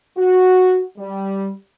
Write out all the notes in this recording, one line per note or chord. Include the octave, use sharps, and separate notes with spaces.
F#4
G3